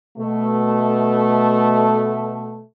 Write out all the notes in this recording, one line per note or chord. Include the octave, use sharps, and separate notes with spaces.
B2 A3